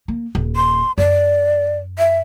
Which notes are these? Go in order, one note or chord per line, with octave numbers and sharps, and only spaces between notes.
A#3
D#1
C6
F#2 D5
E5